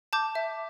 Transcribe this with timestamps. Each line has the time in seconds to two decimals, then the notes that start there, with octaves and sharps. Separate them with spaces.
0.13 A5 D6 G6
0.35 E5